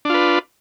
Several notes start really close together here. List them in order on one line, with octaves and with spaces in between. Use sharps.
D4 F4 B4